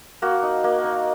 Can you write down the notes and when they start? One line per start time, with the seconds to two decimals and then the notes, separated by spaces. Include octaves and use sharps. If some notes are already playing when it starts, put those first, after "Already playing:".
0.22 A#3 F#4
0.43 D#4
0.64 A#3
0.84 D#4